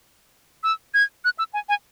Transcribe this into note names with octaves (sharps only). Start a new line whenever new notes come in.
E6
G#6
F#6
E6
G#5
G#5